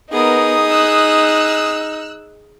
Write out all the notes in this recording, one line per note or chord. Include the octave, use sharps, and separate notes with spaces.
B3 D#4 G#4 A#4 D#6
E6 F#6